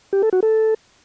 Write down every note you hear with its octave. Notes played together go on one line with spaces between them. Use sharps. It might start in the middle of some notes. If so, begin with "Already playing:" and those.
G4
A4
F#4
A4